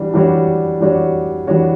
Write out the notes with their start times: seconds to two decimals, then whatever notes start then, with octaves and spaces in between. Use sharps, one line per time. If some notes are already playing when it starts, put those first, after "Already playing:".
Already playing: E3 G3 D4 F#4
0.14 E3 G3 D4 F#4 C#5
0.81 E3 G3 D4 F#4 C#5
1.47 E3 G3 D4 F#4 C#5